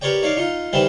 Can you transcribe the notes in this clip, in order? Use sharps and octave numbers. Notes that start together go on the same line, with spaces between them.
G4 A#4 B4 C#5 D5 G5
D#4 C#5 D5 F5 D6
D#4 F4
D#3 E3 G3 E4 B4 C5